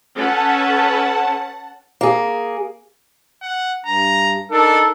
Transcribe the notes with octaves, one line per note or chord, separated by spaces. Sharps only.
C#4 A4 B4 F#5 A5
A#3 G#4
F#5
G2 A#5
D4 D#4 A4 A#4